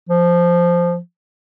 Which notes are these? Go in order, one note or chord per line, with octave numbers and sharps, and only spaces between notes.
F3